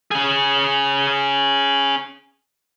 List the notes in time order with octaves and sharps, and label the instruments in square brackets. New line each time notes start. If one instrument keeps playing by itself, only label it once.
[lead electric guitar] C#4 G#4